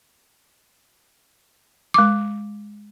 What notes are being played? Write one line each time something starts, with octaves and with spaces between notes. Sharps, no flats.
G#3 D6